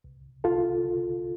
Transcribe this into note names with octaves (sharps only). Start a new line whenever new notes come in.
C2
C2 F4 A4